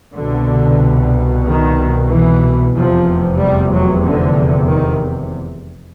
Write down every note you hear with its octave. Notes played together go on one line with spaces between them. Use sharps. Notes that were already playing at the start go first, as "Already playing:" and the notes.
C2 B2 D3
D#3
E3
F1 E2 C3 F3
G3
F#3
D3
D#3